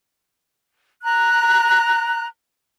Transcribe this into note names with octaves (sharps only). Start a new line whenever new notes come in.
A#5 F#6